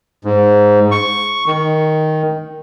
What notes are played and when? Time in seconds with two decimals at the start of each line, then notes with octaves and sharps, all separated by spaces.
0.25 G#2
0.91 C#6
1.47 D#3